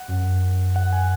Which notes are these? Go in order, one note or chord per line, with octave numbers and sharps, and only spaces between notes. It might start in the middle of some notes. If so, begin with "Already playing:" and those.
Already playing: F#5
F#2
F#5
G#5